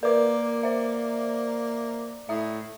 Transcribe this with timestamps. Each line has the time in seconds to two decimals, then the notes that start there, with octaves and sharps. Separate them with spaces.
0.03 A#3 A#4 B4 D5 D6
0.63 C5 E5
2.29 A2 E5 D#6